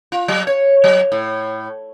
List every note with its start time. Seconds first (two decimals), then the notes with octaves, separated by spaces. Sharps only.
0.12 F4
0.28 F#3
0.47 C#5
0.84 F#3
1.12 A2